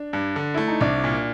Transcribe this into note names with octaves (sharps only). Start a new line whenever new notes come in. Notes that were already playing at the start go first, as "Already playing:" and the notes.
Already playing: D4
G2
D3
A3 E4
D#4
C2 D4
A#2